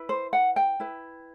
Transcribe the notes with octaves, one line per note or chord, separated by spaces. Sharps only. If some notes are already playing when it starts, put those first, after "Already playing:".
Already playing: E4 B4
C5
F#5
G5
E4 B4